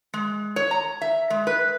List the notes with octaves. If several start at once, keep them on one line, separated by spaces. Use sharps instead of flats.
G#3
C#5
A#5
E5
G#3
B4